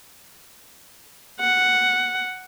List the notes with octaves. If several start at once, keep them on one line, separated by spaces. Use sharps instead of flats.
F#5